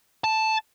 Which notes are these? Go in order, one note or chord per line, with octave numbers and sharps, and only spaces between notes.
A5